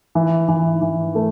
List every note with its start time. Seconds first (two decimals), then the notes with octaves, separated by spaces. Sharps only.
0.15 E3
0.48 E3
0.82 E3
1.15 A3